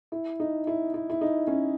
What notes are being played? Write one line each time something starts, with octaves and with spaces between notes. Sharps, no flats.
E4
D#4
E4
E4
E4
D#4
C#4